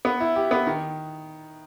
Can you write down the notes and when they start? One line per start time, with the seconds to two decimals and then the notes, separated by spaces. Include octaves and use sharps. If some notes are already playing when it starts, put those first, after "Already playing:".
0.05 B3
0.20 E4
0.36 G4
0.51 B3
0.67 D#3